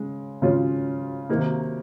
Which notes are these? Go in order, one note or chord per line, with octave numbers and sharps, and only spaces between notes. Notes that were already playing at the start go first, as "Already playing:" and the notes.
Already playing: C#3 G#3 C#4
C#3 G#3 C#4 F4
C3 D#3 A#3 D#4